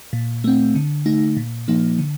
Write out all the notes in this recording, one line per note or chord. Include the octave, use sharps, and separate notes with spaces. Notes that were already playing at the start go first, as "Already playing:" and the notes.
A#2
A3 C4
D3
A3 D#4
A#2
F3 A#3 D#4
D3